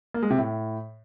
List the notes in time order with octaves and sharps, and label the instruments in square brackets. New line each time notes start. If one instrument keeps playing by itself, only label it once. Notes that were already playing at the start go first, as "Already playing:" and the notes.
[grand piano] A#3
G#3
C3
A2